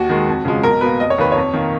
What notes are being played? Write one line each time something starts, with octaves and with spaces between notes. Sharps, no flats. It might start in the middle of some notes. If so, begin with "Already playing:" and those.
Already playing: D#2 F#4
D#3 G#3
F2
C#3 F3 G#3
B1 A#4
B2 A#3 B4
F1 D#5
C#5
D#2 D#3 A#3 B4
F2 C#5
D#3 A#3